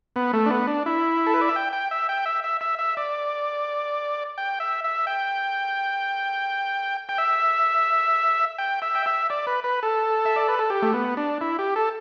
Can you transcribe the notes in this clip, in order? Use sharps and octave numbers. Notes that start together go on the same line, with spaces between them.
B3
A3
D4
B3
D4
E4
A4
B4
D5
E5
G5
G5
E5
G5
E5
E5
E5
E5
D5
G5
E5
E5
G5
G5
E5
G5
E5
G5
E5
D5
B4
B4
A4
E5
D5
B4
A4
G4
A3
B3
D4
E4
G4
A4